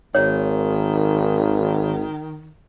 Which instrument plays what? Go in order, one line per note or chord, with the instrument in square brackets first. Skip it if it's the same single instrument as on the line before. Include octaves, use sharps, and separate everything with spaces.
[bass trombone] G#1 [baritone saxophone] D#3 [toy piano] C#5